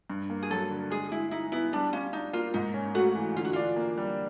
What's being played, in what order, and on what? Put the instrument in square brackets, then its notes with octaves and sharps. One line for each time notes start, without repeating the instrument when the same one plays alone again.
[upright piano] G2
A#3
[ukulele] G#4
[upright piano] F#3 [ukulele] A4
[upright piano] D3
[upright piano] G#3 [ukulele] G#4
[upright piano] G#3 [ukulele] E4
[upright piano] D#4 [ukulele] E4
[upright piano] B3 [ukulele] E4
[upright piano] G3 [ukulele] D4
[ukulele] C#4 [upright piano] F4
[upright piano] D4 [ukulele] D#4
[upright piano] A#3 [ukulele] F4
[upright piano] G#2 [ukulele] D#4
[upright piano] C#4
[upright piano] A3 [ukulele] F#4
[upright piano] E3
[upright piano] D3 [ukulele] F4
[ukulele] F#4
[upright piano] D4 [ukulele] F4
[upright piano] A#3
G3